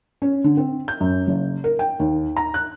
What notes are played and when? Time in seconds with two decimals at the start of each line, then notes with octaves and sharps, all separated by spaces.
0.22 C#4
0.44 D3
0.57 C4
0.88 G6
1.00 F#2
1.27 F#1
1.64 A#4
1.79 G5
2.00 D#2
2.36 A#5
2.54 F#6